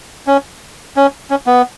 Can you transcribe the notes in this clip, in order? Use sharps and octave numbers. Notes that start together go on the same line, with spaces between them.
C#4
C#4
C#4
B3